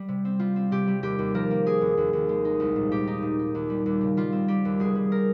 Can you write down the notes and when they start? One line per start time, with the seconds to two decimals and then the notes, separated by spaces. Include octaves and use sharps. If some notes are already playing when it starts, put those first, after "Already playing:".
Already playing: G3
0.08 C3
0.25 C4
0.39 G3 F4
0.56 C4
0.71 C3 G4
0.87 G3
1.03 D#2 G4
1.19 D#2
1.34 F3 A#4
1.51 A#3
1.66 A#3 G#4
1.81 D#2
1.97 D#2
2.13 D#2
2.29 G#3
2.45 D#4
2.60 C2
2.76 A#2
2.91 A#2 G4
3.07 D#4
3.23 A#2
3.39 D#4
3.55 D#2
3.70 G3
3.86 D#2
4.01 C#3
4.17 G3 F4
4.32 C4
4.48 G3 G4
4.65 D#2
4.80 F1 G#4
4.95 G3
5.12 A#4